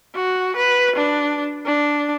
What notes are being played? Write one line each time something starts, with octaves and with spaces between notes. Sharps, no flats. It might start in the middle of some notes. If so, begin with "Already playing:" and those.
F#4
B4
D4
D4